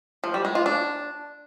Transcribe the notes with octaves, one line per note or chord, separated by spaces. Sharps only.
F3
G3
G#3
F4
D4